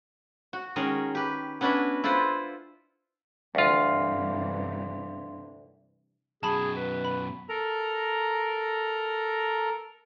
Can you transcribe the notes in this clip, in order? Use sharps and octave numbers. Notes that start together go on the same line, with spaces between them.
F#4
D#3 G#3 C#4 G#4 A#4
G4 B4
B3 C#4 D4 E4 F#4 B4
E4 F4 A4 B4 C5
D2 G2 C3 E3 D4 F4 F5 C6
F#2 B2 G#4 A5 B5
B4
B5
A4 A#4 A#5